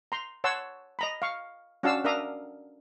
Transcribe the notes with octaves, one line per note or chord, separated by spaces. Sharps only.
A#5 C6
C#5 F#5 A5 C6 E6
D#5 A#5 B5
F5 C#6
C#4 D4 F#4 F5 A5 E6
D4 A#4 E5 F5 A#5 D#6